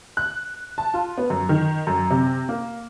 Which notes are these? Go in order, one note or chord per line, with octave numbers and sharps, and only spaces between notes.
F#6
A5
F4
B3
F#2
D#3
F#2
C3
A#3